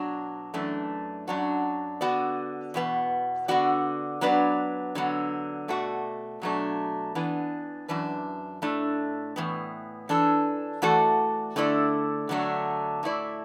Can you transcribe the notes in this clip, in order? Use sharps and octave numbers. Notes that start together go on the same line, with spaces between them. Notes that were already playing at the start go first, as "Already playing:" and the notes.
Already playing: B2 F#3 D4
F#2 E3 A3 D4
F#2 F#3 D4 F#4
D3 B3 F#4 D5
E2 B2 B3
D3 B3 F#4 D5
F#3 B3 D4 B4 D5
D3 F#3 B3
B2 A3 F#4 D5
B2 F#3 A3 D4
E3 B3 D4
F#2 E3 D4 B4
A2 A3 D4
A2 E3 B3
E3 D4 A4
E3 A3 F#4 A4 D5
D3 A3 E4 A4 D5
D3 F#3 A3 D4
A2 A3 E4 D5